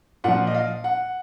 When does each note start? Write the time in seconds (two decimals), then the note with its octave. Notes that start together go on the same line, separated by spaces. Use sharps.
0.24 A#2 F3 F#5
0.47 D#5
0.55 F5
0.84 F#5